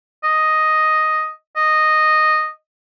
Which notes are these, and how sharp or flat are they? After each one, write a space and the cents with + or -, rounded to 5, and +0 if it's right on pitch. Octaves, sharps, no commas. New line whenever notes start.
D#5 +0
D#5 -10